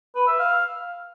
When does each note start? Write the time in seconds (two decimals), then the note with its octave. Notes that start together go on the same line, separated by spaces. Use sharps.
0.15 B4
0.27 E5
0.39 F5